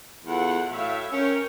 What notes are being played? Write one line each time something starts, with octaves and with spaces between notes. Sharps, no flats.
E2 F4 A4 F#5
A2 F#4 E5 F5
C#4 A#4 C#5 G5